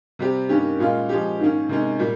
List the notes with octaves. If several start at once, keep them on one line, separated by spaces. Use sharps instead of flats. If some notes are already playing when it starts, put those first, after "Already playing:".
C3 G3 C4 G4
G2 D#3 A#3 C#4 G4
A#2 G#3 C#4 F4
F3 G#3 C#4 G4
G#2 D#3 A#3 C#4
C3 D#3 G#3 C#4
A#2 G3